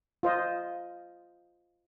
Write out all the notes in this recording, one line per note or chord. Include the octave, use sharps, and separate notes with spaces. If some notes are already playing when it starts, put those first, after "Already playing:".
F4 C5 D#5